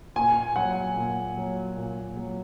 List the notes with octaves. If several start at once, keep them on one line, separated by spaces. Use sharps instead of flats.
A#2 G#5
F#3 F#5
A#2
F#3
A#2
F#3